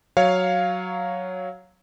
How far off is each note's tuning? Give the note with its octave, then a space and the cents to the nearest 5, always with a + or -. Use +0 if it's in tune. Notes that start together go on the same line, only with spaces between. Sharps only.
F#3 +0 C#5 +0 F5 +0